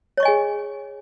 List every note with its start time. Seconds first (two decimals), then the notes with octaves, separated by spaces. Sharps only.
0.17 C#5
0.20 C#6
0.23 D#5
0.25 G#5
0.28 G#4